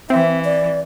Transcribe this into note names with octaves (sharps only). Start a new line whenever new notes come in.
E3 C4 E5
D5